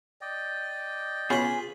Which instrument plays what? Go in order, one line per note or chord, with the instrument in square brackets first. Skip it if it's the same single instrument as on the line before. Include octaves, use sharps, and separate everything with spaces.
[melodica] D5 D#5 G5
[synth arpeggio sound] B3 C#4 [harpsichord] F4 B5 [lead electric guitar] G#4